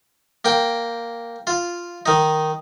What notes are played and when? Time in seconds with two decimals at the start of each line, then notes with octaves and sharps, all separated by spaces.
0.45 A#3 G5
1.47 F4
2.06 D#3 D#4